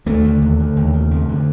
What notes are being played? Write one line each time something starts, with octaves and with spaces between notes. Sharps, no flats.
D#2 A3
D3
D#2
D3
D#2
C#3
F2
D3